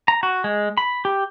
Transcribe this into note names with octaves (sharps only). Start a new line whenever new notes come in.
A#5
F#4
G#3
B5
G4